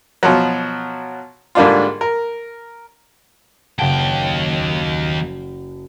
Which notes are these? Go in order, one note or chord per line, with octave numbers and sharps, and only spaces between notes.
B2 F3 F#3
G#2 D3 G3 A#3 D4 F4
A#4
F#1 D#2 F#5 G5 A5